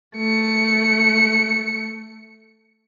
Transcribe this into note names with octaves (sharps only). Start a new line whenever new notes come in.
A3 C#7